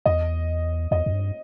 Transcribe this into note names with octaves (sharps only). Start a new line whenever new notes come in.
E2 D#5
E2 D#5
E2
G2